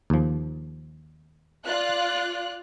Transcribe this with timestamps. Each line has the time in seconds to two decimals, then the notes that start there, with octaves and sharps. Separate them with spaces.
0.10 D#2 F3
1.66 F4 D5 F#6